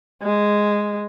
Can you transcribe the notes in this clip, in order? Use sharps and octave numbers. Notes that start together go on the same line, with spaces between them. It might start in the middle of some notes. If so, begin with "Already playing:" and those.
G#3